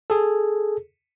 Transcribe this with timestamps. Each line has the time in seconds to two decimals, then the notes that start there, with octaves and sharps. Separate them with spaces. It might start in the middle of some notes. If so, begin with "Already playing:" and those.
0.10 G#4 A4